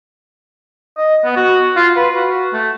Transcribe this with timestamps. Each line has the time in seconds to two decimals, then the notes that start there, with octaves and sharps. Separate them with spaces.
0.97 D#5
1.24 B3
1.36 F#4
1.76 F4
1.96 B4
2.15 F#4
2.53 A3